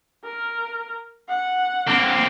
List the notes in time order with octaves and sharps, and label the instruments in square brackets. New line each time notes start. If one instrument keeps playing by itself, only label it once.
[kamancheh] A#4
F#5
[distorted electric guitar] A#3 C4